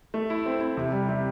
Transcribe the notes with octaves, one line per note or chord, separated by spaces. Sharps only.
A3
E4
C4
E4
C3
G3
C3